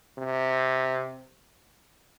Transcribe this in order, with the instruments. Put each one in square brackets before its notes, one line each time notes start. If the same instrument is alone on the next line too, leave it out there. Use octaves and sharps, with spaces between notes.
[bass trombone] C3